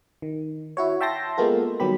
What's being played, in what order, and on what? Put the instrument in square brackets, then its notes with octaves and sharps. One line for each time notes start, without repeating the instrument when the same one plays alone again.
[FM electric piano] D#3
E4 F#4 C#5
E5 G5 A5 C6 A#6
G#3 A#3 B3 F4 A4
D#3 F#3 G3 B3 G4 B5